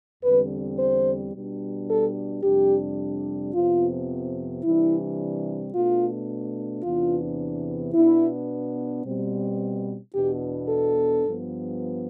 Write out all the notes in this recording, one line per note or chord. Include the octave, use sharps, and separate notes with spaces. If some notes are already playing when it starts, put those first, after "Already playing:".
E2 D3 G3 C4 B4
C5
B2 G3 D4
A4
F2 C3 G3 D4 G4
F2 C3 F3 B3 F4
C3 E3 G3 D4 E4
B2 A3 D4 F4
E2 C3 E3 B3 D4 F4
B2 B3 D4 E4
B2 G3 C4
E2 B2 B3 D4 G4
A4
G2 F3 B3